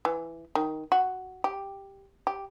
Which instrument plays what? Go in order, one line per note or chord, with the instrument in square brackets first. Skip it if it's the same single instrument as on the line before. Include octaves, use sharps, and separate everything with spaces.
[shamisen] E3
D#3
F#4
G4
G4